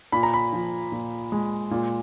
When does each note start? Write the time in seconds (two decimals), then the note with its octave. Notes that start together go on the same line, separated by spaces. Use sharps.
0.12 A#2 B5
0.23 A#5
0.34 B5
0.53 F3
0.92 A#2
1.32 G#3
1.71 A#2